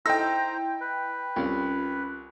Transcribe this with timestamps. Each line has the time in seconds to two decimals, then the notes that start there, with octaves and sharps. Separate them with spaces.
0.06 D#4 E4 A4 C5 G5 A#5 E6 A#6
0.81 B4
1.36 C2 C#4 F4